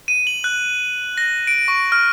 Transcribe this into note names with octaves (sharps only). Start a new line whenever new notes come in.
D#7
F#7
F#6
A#6
D7
C#6
F6